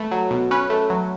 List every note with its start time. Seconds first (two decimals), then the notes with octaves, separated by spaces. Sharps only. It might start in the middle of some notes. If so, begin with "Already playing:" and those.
Already playing: A3 B4
0.11 F#3
0.31 B2
0.51 C#4 B4
0.70 A3
0.90 F#3